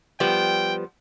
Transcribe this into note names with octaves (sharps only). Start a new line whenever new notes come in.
F3 G3 B3 G5